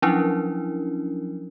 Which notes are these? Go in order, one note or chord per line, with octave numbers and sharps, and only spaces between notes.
F3 F#3 C#4 D4 E4 A#4